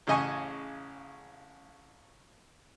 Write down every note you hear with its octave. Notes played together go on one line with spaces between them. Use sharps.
A1 C#3 D#5 G#5 C#6